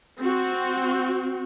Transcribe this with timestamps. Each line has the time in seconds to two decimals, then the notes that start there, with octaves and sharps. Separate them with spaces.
0.20 C4 F#4